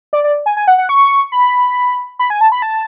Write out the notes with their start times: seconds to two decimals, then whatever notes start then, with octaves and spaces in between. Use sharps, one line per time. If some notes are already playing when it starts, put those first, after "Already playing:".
0.13 D5
0.24 D5
0.46 G#5
0.57 G#5
0.68 F#5
0.78 F#5
0.89 C#6
1.32 B5
2.19 B5
2.30 G#5
2.41 A5
2.52 B5
2.62 A5